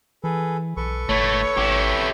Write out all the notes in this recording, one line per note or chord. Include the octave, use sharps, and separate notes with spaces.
E3 G#4 A4 B4
B1 A4 B4 C#6
G1 A3 E4 C#5
G#1 E4 G4